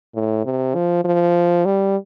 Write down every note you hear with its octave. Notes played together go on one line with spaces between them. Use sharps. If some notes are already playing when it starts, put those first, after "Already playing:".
A2
C3
F3
F3
G3